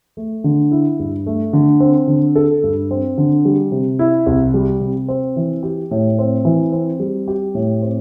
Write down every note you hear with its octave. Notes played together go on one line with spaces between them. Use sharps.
A3
D3
E4
G2
A3
D3
C4
D3
A4
G2
C4
D3
G3
C3
E4
C2
G3
C3
C4
E3
G4
A2
C4
E3
C4
G3
G4
A2
C4